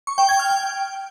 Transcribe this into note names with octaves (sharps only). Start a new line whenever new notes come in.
C#6
G5
G#6
F6
G5